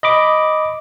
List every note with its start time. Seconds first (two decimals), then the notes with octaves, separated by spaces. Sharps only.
0.03 D#5 B5 D6